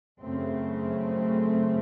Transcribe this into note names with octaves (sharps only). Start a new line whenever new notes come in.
F#2 C#3 A3 C4